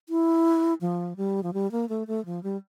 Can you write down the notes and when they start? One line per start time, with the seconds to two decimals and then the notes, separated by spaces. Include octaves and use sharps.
0.09 E4
0.81 F3
1.17 G3
1.43 F3
1.54 G3
1.72 A#3
1.89 A3
2.07 A3
2.26 F3
2.43 G3